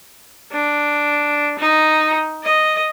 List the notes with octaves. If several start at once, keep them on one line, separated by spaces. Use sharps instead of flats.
D4
D#4
D#5